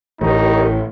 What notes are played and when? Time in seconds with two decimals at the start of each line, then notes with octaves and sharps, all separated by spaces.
0.21 A1 A2 E3 D#4 G4 A#4 C#5